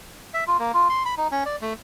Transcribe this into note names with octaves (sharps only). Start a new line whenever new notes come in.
E5
F4
A#3
F4
C6
B5
D#4
C#4
D5
A3